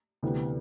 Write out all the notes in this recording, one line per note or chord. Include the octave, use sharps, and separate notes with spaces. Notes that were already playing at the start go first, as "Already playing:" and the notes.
D2 C3 E3 B3